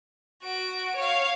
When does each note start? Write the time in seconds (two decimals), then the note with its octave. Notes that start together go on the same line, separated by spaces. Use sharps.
0.43 F#4 D7
0.96 C#5 F5